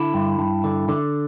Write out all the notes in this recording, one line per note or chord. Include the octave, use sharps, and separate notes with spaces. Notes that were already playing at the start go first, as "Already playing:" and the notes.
Already playing: D3 E4
G2
G2
D3
D3